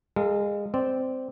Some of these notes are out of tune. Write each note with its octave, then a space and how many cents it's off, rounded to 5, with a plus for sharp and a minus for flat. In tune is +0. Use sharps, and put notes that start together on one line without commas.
G#3 -25 A4 +30 F5 +0
C4 -10 D5 +0